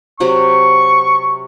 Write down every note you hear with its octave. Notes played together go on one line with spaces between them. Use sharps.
C3 F#3 F#5 C#6